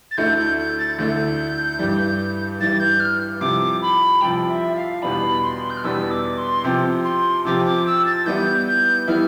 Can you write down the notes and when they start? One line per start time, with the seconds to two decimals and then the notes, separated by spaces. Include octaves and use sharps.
0.11 A6
0.17 D2 D3 A3 E4 G6
0.37 G6
0.58 G6
0.78 A6
0.98 D2 D3 A3 E4 G6
1.79 G2 E3 G3
2.60 G2 E3 G3 A6
2.80 G6
3.00 F6
3.41 C2 C3 F3 D6
3.82 B5
4.21 C2 C3 F3 G5
4.48 E5
4.76 F5
5.02 E2 B2 G3 B3 D4 B5
5.43 C6
5.70 G6
5.77 F6
5.83 E2 B2 G3 B3 D4 E6
6.11 D6
6.38 C6
6.64 C3 F3 C4 G4
7.05 C6
7.45 C3 F3 C4 G4 D6
7.65 D6
7.86 E6
8.05 A6
8.26 E3 G3 B3 E4 G6
8.67 G6
9.08 E3 G3 B3 E4 F6